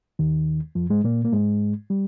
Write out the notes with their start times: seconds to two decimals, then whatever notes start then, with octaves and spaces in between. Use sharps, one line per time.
0.19 D#2 D#3
0.75 F2 F3
0.90 G#2 G#3
1.04 A#2 A#3
1.24 A#3
1.32 G#2 G#3
1.90 G3